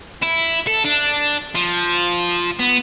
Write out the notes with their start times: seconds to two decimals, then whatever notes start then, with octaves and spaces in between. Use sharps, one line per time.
0.22 E4
0.67 A4
0.84 D4
1.55 F3
2.59 B3